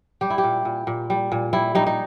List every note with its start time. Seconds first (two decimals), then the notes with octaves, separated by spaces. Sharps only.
0.21 G3 G4
0.30 E4
0.38 G4
0.44 A#2
0.65 A#2
0.87 A#2
1.10 G3
1.32 A#2
1.53 G3 E4
1.75 G3 D#4
1.86 D#4